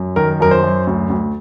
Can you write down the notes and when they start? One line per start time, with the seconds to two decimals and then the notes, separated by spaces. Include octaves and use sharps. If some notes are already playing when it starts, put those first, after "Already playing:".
Already playing: F#2
0.16 D#3 A#4
0.40 F#2 A#4
0.51 C5
0.63 F#2
0.87 D2
1.10 D2